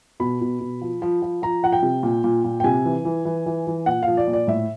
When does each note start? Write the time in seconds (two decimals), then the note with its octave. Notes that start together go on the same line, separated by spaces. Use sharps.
0.20 B2 B5
0.41 B2
0.60 B2
0.81 F3
1.02 F3
1.22 F3
1.42 F3 A#5
1.63 F3 F#5
1.72 G5
1.83 C3
2.03 A#2
2.24 A#2
2.44 A#2
2.60 G5
2.64 C3 G#5
2.85 E3
3.05 E3
3.25 E3
3.46 E3
3.67 E3
3.86 A#2 F#5
4.03 F5
4.08 F3
4.17 D5
4.27 A#2
4.33 D5
4.47 A2 E5